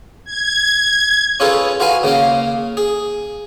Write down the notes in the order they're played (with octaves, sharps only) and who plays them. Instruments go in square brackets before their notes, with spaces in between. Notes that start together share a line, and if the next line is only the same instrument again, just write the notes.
[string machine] G#6
[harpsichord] C#4 F4 G#4 A4 B4 C#5
F4 F#4 B4 F5 G#5
C#3 A#3 C#4 F5
G#4